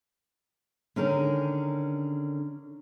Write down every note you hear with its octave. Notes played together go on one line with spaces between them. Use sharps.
D3 D#3 C#4 G#4 A#4